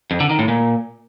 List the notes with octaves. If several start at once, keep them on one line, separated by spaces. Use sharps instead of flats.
F2
D3
D#3
A2
A#2